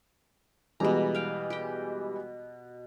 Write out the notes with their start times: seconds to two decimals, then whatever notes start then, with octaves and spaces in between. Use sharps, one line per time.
0.80 B2 E3 G3 G#3 A#5
1.14 F5 G5
1.50 G4 G5